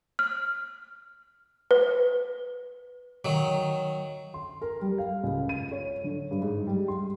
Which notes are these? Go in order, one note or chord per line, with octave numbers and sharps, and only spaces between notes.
F6
B4
D#3 F#3
C6
A#4
G3
F5
C#2
D#7
C#5
D3
G2
G#2
G3
C6